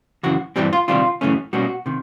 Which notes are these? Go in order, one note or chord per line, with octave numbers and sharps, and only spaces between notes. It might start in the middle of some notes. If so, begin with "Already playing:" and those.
F#2 C#3 E3 F#4
G2 E3 G3 C4 G4
F4
C3 D#3 G3 C4 F4
F#2 C#3 E3 A3 C#4
B2 G3 A#3 C#4 F#4
C3 D#3